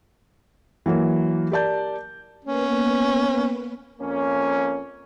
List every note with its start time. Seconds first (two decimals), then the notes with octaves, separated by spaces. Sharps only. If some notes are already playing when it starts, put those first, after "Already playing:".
0.86 E3 F#3 A#3
1.51 G4 A#4 D5 A5 G6
2.45 A#3 B3 C#4 B4
4.00 F2 A#3 C#4